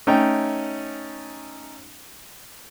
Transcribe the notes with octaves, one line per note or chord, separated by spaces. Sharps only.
A3 C#4 D#4 G5